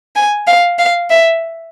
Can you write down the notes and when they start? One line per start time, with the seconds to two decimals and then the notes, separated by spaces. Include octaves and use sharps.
0.16 G#5
0.47 F5
0.79 F5
1.10 E5